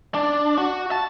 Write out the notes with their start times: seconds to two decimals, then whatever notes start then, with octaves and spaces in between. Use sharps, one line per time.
0.15 D4
0.58 F#4
0.92 A5